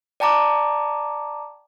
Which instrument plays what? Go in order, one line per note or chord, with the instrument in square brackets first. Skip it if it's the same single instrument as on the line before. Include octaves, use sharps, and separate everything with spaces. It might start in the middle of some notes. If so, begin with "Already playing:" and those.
[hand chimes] D5 G5 A5 A#5 D6